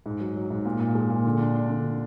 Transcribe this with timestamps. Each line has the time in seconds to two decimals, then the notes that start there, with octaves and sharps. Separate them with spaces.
0.06 G#2
0.20 F#3
0.36 F#3
0.50 G#2
0.66 A#2
0.80 A#2
0.95 G#3
1.10 A#2
1.25 D3
1.39 D4
1.55 D4
1.69 D3